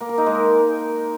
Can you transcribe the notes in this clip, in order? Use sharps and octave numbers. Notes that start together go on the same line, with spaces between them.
A#3
A#4
D#4
G#3
A#4